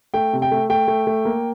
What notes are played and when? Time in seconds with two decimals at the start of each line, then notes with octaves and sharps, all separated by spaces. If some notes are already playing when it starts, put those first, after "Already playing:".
0.14 A3 G5
0.33 C3
0.42 G5
0.51 A3
0.70 A3 G5
0.88 A3
1.07 A3
1.25 A#3